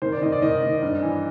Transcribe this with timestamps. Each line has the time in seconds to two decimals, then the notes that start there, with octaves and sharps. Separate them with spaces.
0.02 D#3 C5
0.12 D5
0.22 D#3 D#5
0.32 D5
0.42 D#3 D#5
0.63 D#3
0.82 G2
1.02 E3